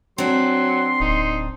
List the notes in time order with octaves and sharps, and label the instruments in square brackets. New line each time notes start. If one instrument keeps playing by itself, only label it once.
[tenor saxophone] F#3 [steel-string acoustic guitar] C4 D4 [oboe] C6
[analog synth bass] D1 [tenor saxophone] D#4